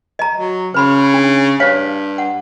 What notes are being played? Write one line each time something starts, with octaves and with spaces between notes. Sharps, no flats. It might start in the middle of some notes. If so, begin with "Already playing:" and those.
D#5 A#5
F#3
C#3 C5 B5 C6
D4
G2 C5 C#5 F5
F#5